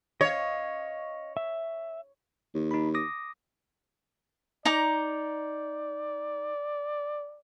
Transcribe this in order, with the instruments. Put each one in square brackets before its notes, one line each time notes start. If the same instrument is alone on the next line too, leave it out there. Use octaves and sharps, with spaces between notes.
[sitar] C#5 [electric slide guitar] D#5 F5
[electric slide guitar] E5
[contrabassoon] D#2
[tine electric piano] D#4 B5
D6 D#6 A#6
[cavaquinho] D#4 A#5 D6 [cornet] D5